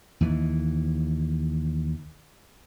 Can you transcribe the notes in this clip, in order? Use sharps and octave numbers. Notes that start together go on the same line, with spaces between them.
D#2 E3